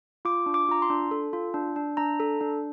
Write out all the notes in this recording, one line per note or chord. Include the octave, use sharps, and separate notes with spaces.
F4 D6
D4
D6
F4 A#5
C6
D4
A4
F4
D4
D4
D4 A#5
A4
D4